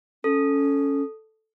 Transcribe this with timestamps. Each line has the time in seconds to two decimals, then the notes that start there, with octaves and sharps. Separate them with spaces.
0.24 C#4 A4